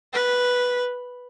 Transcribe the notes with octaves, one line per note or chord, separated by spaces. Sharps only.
B4